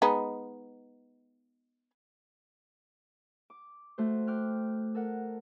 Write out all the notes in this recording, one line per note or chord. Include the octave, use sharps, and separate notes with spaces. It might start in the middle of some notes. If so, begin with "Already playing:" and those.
G#3 B3 D#4
D6
A3 F#4 C5
G5 D6 F6 F#6
A4 A#4 F#5